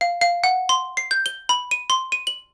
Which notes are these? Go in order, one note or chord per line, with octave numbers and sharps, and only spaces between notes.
F5
F5
F#5
C6
C7
G6
G7
B5
D#7
C6
D#7
F#7